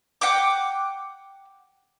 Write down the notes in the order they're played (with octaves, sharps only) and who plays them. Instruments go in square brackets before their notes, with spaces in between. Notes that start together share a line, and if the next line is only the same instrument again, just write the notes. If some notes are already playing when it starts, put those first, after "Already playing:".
[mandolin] F#5 G5 D6